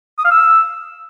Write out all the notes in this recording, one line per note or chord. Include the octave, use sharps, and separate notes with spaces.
D#6
F5
E6